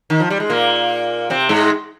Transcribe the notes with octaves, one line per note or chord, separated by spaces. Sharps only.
D#3
F3
G3
G#3
A#2 A#3
C3 C4
G#2 G#3